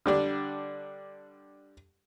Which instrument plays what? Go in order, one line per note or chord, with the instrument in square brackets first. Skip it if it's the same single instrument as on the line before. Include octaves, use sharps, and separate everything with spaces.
[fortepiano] D3 G3 D4